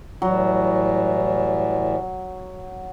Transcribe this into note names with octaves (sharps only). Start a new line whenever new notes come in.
A2 E3 F#3 G3